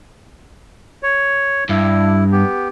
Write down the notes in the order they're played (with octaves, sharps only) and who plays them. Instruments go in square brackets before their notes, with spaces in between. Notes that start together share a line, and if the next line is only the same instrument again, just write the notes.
[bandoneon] C#5
[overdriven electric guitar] G2 [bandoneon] E4
[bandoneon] B3 G4